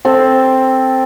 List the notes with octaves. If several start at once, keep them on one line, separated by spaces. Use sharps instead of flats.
C4 A4